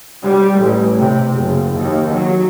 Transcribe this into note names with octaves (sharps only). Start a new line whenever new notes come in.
G3
A1
C3
F#1
D#2
F#3